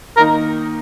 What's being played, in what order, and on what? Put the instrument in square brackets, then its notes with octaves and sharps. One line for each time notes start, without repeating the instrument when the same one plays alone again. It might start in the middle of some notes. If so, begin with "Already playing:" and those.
[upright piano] D#3 A#3 D#4 [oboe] A#4